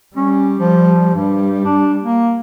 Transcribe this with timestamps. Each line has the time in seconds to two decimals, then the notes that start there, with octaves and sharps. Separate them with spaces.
0.16 G3 C#4
0.59 F3
1.15 G2 G3
1.65 D4
2.02 A#3